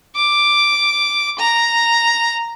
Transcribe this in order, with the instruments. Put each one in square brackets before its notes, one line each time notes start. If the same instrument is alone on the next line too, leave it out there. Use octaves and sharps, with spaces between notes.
[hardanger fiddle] D6
A#5